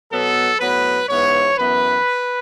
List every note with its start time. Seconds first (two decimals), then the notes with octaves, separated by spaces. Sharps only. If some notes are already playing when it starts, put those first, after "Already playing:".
0.11 B2 F#3 B3 A4
0.60 A2 F#3 B3 B4
1.08 G#2 E3 B3 C#5
1.58 F#2 E3 B3 B4